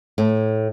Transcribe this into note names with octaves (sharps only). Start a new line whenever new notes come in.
A2